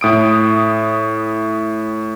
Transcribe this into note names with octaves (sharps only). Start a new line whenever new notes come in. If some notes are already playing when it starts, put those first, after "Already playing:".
A2 D#6 D7